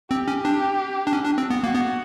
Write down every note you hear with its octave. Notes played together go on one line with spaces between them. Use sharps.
C4 G4
C#4
D4
D4
C#4
D4
C4
B3
A#3 F#4
B3